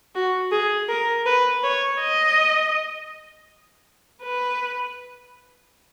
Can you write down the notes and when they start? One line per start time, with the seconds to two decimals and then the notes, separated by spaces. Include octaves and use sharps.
0.15 F#4
0.51 G#4
0.89 A#4
1.26 B4
1.63 C#5
2.00 D#5
4.23 B4